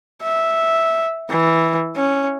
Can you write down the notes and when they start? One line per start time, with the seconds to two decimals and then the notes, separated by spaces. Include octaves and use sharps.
0.23 E5
1.30 E3
1.96 C#4